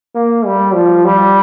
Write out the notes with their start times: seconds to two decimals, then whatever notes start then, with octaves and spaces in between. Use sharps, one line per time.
0.16 A#3
0.46 G3
0.74 F3
1.05 G3